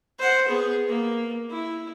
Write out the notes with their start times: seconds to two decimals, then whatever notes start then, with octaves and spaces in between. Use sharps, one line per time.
0.19 C5 F#5
0.48 B3 G#4
0.88 A#3
1.50 E4